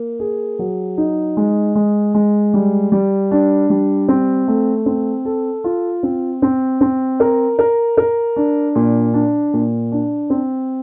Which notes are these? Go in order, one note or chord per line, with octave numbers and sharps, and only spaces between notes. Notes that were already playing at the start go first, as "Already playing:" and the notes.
Already playing: A#3
G#4
F#3
D#4
G#3
G#3
G#3
G3
G3
D4
G3
C4
A3
C4
A4
F4
C4
C4
C4
A#4
A#4
A#4
D4
A#2
D4
A#2
D4
C4